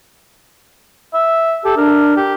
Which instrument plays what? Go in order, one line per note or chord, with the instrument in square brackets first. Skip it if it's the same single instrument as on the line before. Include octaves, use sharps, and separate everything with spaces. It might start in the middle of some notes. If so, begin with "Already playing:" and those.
[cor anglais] E5
[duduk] G4 [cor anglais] A4
[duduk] D4 [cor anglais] A#4
[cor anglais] G4